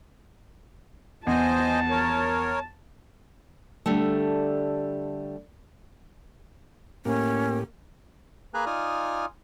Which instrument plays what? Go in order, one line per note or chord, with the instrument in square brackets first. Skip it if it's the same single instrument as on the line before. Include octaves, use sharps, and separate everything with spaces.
[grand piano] E2 [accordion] C5 D#5 G#5 [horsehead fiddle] A5
[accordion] A#4 C#5
[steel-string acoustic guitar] D3 G3 A3
[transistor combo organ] A2 G4 [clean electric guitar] A#3 [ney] C#4
[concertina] A#3 G#4 B4 G#5 A#5 F#6
D#4 F4 D5 G#5 D#6 F6